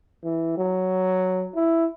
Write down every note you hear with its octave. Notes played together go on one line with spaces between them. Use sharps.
E3
F#3
E4